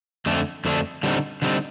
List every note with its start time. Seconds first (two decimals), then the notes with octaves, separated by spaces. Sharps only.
0.26 F2 D3 A3 D4
0.65 F2 D3 A3 D4
1.03 D3 G3 C4 D#4
1.42 D3 G3 C4 D#4